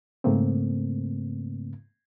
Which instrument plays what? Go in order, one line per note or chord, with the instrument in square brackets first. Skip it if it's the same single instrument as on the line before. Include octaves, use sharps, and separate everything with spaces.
[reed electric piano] G#2 C#3 A3 A#3 C4